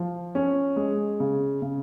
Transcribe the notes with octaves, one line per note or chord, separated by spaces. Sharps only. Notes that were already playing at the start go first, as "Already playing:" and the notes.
Already playing: F3
C#4
G#3
C#3
C#3